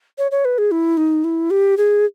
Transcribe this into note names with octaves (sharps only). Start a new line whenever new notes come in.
C#5
C#5
B4
G#4
E4
D#4
E4
G4
G#4